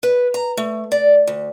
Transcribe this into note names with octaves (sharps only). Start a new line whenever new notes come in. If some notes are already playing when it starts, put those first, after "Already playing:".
B4
A#5
A3
D5
D2